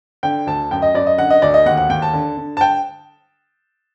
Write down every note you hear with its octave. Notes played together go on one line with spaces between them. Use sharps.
D3 G5
D2 A5
F#2 G5
D#5
F#2 D5
D#5
D3 F#5
D#5
D2 D5
D#5
D#2 F#5
F#5
D#2 G5
A5
D3
D3
A5
G5